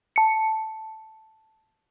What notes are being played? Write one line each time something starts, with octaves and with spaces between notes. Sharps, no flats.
A5 C#7